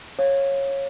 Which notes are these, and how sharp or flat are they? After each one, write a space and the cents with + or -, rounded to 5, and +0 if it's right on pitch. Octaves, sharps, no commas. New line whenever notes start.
C#5 -15 F5 +0